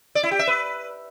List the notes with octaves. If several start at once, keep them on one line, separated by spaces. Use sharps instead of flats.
D5
E4
G4
E5
B4